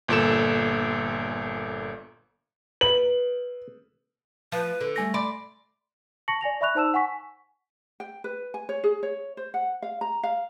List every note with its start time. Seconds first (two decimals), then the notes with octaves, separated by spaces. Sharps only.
0.08 G1 A#2 A4 E7
2.81 B4 F#7
4.52 F3 B4
4.81 D3
4.96 G3 A3 G#5 A#6
5.14 D5 B5 C6
6.28 A5 C#6 A#6 C#7 F#7
6.41 D5 G#5 A#6 F7
6.61 D5 E5 B5 C#6 F#6 F7
6.75 D#4 C5 A5 E6 E7
6.94 F#5 G#5 C#6 B6
8.00 G5
8.24 B4
8.54 G#5
8.69 C#5
8.84 G#4
9.03 C#5
9.37 C5
9.54 F#5
9.82 F5
10.01 A#5
10.23 F5